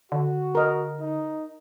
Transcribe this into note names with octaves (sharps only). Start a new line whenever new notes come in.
D3 F#4
A#4 D#5
D#4